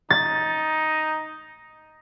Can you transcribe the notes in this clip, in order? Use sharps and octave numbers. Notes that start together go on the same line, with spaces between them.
D#4 A6